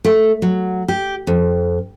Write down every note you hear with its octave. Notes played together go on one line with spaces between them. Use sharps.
A3
F#3
G4
F2